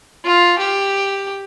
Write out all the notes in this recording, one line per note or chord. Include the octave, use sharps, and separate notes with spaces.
F4
G4